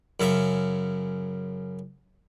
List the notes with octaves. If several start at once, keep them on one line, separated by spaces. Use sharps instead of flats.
F#2 C#3 E5